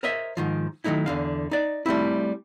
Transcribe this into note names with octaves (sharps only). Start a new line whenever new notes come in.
A#4 C5 C#5 D#5 E5
G#2 D#3 F3
D#3 F#3 A3 D#4 E4
E2 D3 F5
D#4 D5
G3 A3 C4 E4